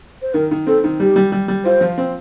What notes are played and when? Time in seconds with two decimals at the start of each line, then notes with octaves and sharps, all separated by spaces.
0.22 C5
0.34 D#3 A#4
0.51 D#3
0.67 C4 A4
0.84 D#3
1.00 G3 G4
1.16 G3
1.32 G3
1.48 G3
1.65 F4 C5
1.81 F3
1.98 C4